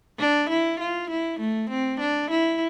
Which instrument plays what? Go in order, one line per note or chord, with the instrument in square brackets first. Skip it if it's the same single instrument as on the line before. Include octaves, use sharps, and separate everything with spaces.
[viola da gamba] D4
E4
F4
E4
A3
C4
D4
E4